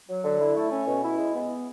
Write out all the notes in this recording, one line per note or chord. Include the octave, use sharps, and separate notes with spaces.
F#3
D3
E4
A3
C#4
B2
E4
G#3
B3